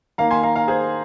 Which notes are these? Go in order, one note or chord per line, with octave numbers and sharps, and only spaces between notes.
D#3 A#3 F5 A#5
G#5 C6
F5 A#5
F5 A#5
G#4 C5